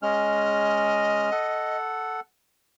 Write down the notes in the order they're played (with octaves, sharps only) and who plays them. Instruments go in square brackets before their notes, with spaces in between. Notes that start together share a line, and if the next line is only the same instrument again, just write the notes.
[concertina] G#3 C#4 F6 [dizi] D#5
[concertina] A4 F#5